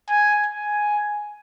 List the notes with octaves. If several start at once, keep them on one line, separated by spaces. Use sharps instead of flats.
G#5
G#5